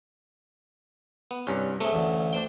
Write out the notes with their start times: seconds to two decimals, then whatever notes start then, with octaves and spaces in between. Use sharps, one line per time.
1.31 B3
1.47 C2 G2 C#4
1.80 C3 G#3 A3
1.93 A1 D2
2.33 D4 C5 G5